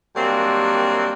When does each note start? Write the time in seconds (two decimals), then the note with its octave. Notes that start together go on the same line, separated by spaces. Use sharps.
0.16 F#2 D#3 G3 A#3 C4 D4